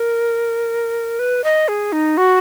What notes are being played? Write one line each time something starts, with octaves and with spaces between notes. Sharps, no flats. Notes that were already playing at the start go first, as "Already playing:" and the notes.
Already playing: A#4
B4
D#5
G#4
D#4
F#4